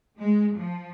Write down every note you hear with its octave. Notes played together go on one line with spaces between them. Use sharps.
G#3
F3